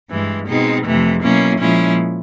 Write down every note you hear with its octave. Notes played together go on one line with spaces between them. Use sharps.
G2 E3 G#3
B2 G#3 C4 D#4
F2 C3 E3 A3
B2 F#3 A#3 C#4 E4
A#2 F3 G#3 C#4 E4